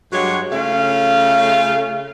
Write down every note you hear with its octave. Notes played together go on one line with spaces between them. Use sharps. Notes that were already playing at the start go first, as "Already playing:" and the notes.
G2 F#3 G#3 F#4 G4 C#5
C#3 A3 C#4 F4 F5